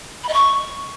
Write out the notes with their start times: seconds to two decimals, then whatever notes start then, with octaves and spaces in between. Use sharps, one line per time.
0.24 B5
0.29 D#5
0.34 C#6